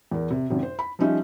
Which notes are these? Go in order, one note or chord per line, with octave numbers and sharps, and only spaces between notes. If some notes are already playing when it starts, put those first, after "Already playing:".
E2 A#4
C3
G#1 F#2 C3
C5
B5
F3 G3 C#4 D#4 E5